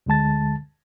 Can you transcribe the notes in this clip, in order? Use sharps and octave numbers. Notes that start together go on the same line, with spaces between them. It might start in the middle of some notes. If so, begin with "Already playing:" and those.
D2 D3 G#3 A5 A6